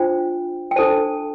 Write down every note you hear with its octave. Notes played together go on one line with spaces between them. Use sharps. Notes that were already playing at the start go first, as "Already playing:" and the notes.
Already playing: D4 F4 C5 G5
G5
D4 A4 C5 A5